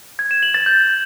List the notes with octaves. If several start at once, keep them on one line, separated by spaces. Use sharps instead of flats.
G#6
E7
F#7
A6
G6